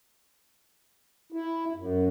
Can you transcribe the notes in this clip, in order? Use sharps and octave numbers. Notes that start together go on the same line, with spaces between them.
E4
F#2